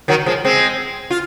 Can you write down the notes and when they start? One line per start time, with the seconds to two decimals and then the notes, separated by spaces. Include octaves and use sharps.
0.08 D#3 F#3
0.26 F3 G#3
0.44 G#3 C4
1.11 F4